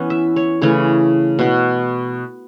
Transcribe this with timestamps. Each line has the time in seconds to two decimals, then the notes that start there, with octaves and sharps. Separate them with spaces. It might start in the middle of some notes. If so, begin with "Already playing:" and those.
Already playing: E3 B3 C#4
0.10 E5
0.36 C#5
0.62 C#3 E3 A3 C#5
1.39 B2 B3